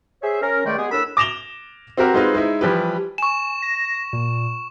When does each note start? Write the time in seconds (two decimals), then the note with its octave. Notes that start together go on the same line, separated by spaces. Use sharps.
0.22 G#4 C5 C#5 E5
0.42 C#4 A#4
0.65 C#2 D#3 G#3 A3 D5 G5
0.77 G#3 B3 G4 G#4
0.91 A2 D4 A#4 B5 E6
1.17 D6 A#6 E7 F7 G7
1.97 C4 F#4 G4 A#4
2.14 G#3 C4 D#4 F4 B4
2.34 G#3 D#4 E4
2.61 E3 F3 G3 G4 B4
3.18 G#5 C#6 E7
3.62 A#6
4.13 A#2